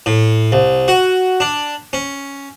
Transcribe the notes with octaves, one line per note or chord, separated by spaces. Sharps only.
A2
C2
F#4
D4
C#4